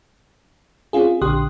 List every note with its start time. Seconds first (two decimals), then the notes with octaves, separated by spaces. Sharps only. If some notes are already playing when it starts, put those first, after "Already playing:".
0.93 C4 C#4 F4 G#4
1.21 A#1 D3 G4 C6 D#6 F#6